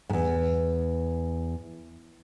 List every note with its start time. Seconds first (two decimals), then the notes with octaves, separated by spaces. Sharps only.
0.09 E2 G#2